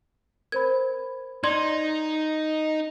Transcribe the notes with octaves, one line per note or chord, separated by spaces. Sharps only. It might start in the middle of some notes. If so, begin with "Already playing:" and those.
A#4 C5 B5 G#6
D#4 D5 C6 G#6